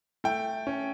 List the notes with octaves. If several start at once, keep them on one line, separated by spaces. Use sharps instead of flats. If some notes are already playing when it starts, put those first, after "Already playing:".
A3 G5
C#4